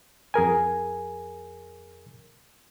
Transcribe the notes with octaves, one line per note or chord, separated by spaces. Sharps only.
F2 G#4 A#4 G#5